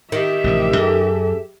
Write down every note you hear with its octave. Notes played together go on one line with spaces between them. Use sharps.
D#3 G4 E5
A1 C3 F3
F#2 G#4 A4